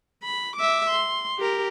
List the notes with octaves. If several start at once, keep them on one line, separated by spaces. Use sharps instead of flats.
B5
E5 D6
C6
G4 A#4